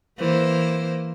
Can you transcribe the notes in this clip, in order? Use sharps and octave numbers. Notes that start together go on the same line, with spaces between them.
E3 A#3 C5